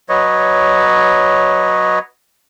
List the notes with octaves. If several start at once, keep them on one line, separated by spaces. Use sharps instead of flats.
F#3 B4 C#5 D#5